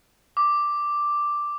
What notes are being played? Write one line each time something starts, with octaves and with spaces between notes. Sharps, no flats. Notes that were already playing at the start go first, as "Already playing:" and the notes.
D6